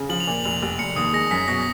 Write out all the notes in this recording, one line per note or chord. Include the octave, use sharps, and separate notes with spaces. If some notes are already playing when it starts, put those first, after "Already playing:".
Already playing: C#3
F3 F#7
F7
A#2 F#7
F1 F7
F1
F1 C#7
D#2 D#6
G#3 A#6
F#2 B6
B2 A#6